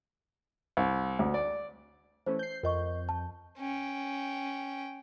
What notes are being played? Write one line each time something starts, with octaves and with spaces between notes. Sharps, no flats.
C2
D2
D5
E3 A3 C#4 C5
G6 C7
F2 A#4 D#5 C#6 G6
A5
C#4 G5